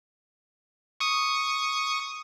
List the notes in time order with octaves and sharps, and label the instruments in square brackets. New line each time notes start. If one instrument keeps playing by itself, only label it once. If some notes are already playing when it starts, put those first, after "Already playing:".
[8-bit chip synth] C#6 D#6